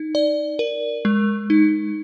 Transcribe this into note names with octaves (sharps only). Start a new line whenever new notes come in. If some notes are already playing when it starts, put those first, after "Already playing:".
Already playing: D#4
D5
A#4
G#3
D#4